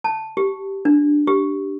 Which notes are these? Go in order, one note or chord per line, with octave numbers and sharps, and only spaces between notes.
A5
G4
D4
G4